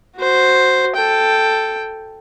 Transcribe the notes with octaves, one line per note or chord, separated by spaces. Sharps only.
F#4 C5
A4 G5